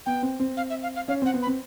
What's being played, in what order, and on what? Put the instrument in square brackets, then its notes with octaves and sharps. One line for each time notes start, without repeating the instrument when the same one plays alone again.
[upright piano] B3 [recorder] G5
[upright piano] C4
C4
[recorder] F5
E5
F5
F5
[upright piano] C#4 [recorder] F5
[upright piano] C4 [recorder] F#5
[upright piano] B3
[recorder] B5
[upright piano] C4